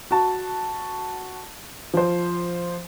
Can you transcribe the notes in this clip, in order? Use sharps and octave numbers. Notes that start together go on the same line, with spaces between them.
F#4 A5
F3 C5